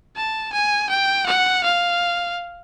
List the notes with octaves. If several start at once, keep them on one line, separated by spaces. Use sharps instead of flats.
A5
G#5
G5
F#5
F5